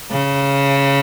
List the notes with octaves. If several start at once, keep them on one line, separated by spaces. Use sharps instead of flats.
C#3